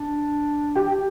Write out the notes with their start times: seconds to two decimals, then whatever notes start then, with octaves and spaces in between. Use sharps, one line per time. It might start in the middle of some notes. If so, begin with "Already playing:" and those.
Already playing: D4
0.75 G4 G5